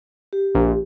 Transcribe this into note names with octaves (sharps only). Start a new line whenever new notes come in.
G4
A#1